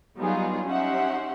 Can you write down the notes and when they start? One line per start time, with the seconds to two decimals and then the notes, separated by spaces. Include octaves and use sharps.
0.19 F#3 G3 B3 D#4 F4 G#4
0.67 C#4 D#4 G4 E5 F#5 C6